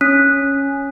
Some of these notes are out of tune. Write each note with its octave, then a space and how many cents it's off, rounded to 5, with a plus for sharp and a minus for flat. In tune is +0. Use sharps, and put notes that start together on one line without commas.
C#4 -5